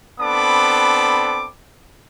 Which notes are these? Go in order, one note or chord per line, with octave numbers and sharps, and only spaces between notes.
B3 C4 D4 A4 B5 D6